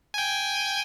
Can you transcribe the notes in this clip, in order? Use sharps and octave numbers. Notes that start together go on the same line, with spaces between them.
G5 G#5